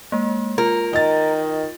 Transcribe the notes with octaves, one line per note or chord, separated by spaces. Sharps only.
G#3 A#3
F4 A#4
D#3 D#5 A6